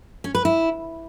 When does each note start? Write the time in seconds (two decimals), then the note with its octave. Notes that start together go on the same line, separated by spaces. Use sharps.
0.24 C#4
0.35 B4
0.45 E4